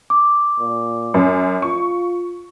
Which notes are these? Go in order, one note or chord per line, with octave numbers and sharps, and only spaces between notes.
D6
A#2
F#2
F4 C#6